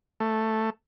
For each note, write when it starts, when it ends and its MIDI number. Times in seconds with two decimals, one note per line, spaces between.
0.20 0.70 57